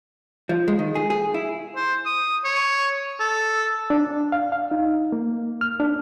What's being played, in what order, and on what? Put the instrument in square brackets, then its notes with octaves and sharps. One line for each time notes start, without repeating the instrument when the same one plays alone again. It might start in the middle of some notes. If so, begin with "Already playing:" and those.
[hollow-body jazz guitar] F3
G#3
D#3
G#4
G#4
E4
[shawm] C5
D#6
C#5
A4
[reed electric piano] D4
F5
F5
D#4
A#3
F6
D4